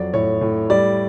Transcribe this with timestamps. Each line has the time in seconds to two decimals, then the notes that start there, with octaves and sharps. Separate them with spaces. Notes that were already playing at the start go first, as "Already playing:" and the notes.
Already playing: F2 F#3 D5
0.13 A2 C#5
0.41 A2
0.70 G3 D5